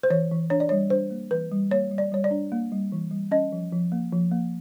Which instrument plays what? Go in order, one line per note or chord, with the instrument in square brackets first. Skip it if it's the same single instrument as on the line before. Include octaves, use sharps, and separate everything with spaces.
[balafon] C5
E3 C#5
E3
D4 C#5
D5
G3 C#5
D4 C5
A#3
E3 B4
G3
A#3 C#5
G3
D5
G3 C#5
D5
D4
A#3
G3
E3
G3
C#4 D#5
F3
F3
A#3
F3
A#3